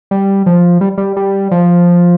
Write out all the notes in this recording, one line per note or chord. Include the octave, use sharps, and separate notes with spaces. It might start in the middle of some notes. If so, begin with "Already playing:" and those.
G3
F3
G3
G3
G3
F3